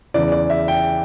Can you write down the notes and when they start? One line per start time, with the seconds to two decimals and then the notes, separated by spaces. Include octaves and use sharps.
0.14 E2 C#3 E3 D5
0.32 D5
0.50 E5
0.68 G5